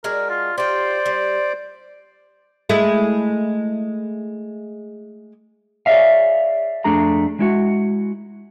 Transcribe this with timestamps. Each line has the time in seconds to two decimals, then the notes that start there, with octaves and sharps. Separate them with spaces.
0.04 G#3 D4 F#4 A#4
0.30 F4
0.58 F4 G4 C5 D5 C6
1.06 G3
2.69 G#3 A3 E4
5.86 G#4 C#5 D5 E5 F5
6.84 F2 A3 D4 G#4 A#5
7.39 G#3 E4 F#4